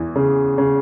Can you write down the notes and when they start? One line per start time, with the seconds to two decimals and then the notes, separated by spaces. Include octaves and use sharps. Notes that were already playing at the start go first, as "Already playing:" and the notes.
Already playing: E2 E3
0.16 C#3
0.58 C#3